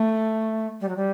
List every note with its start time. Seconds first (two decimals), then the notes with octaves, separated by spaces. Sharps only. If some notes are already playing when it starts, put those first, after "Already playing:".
Already playing: A3
0.81 G3
0.89 F#3
0.96 G3